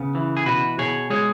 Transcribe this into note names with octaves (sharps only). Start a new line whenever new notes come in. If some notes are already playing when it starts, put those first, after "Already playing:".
Already playing: C#3 B3
E3
G#4
B2 F#4 B4
B2 G#4 C#5
G#3 G#4 C#5